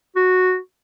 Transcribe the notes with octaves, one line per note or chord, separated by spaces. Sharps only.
F#4